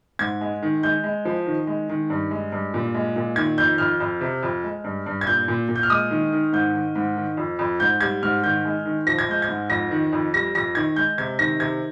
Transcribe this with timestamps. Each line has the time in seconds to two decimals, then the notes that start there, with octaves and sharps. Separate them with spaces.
0.19 G#2 G#6
0.41 G#3
0.62 D#3
0.83 G#3 G6
1.04 G#3
1.25 F3
1.46 D#3
1.67 G#3
1.89 D#3
2.10 G2
2.31 G#3
2.52 G2
2.74 A#2
2.94 G#3
3.16 A#2
3.36 D#3 G#6
3.58 F2 G6
3.78 F2 F6
4.00 F2
4.21 C3
4.43 F2
4.64 G#3
4.84 G2
5.06 G2
5.21 G#6
5.27 A#2 G6
5.48 A#2
5.69 A#2
5.76 G6
5.83 F6
5.90 G#3 D#6
6.11 D#3
6.32 D#3
6.53 G#2 G6
6.74 D#3
6.96 G#2
7.16 D#3
7.37 F2
7.59 F2
7.80 G#2 G6
8.01 G3 G#6
8.23 G#2 F6
8.44 D#3 G6
8.65 G#3
8.85 D#3
9.07 F3 A#6
9.19 G#6
9.28 G#3 G6
9.42 G#6
9.49 G#2
9.70 F2 A#6
9.91 D#3
10.12 F2
10.34 G3 A#6
10.55 F2 A#6
10.75 D#3 G#6
10.96 G#3 G6
11.18 C3 G#6
11.39 D#3 A#6
11.60 C3 G#6